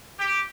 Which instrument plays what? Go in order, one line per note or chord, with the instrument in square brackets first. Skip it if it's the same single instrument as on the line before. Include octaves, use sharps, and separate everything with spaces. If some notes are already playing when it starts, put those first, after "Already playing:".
[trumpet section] G4